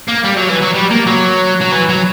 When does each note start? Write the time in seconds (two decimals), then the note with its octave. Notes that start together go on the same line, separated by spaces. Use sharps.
0.09 A#3
0.25 G3
0.37 F#3
0.49 E3
0.61 F#3
0.74 G3
0.90 A#3
1.07 F#3
1.61 F#3
1.72 E3
1.89 F#3